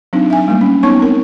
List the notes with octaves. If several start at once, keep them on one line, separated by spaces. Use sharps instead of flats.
F#3 C4 D4 D#4
E5 G#5
G3 A3 A#3
C#4
B3 D#4 C#5 C#6
C4 A#4